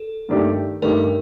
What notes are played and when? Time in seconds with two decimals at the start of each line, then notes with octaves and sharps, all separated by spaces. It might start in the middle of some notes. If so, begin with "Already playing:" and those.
Already playing: A4
0.29 G2 D#3 A3 D4 G4
0.82 G2 D#3 A3 D4 G4 A#4